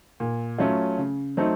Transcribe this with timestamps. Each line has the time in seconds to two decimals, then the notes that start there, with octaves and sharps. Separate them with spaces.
0.20 A#2
0.58 F#3 A3 C#4 F4
0.98 C#3
1.37 F#3 A3 C4 D#4